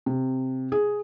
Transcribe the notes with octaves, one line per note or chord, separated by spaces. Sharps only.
C3
G#4